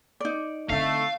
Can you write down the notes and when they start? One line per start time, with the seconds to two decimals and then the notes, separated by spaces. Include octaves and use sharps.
0.20 D#4 D5
0.70 D3 A3 C4 F5